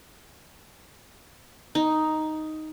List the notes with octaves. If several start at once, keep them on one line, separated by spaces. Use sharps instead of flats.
D#4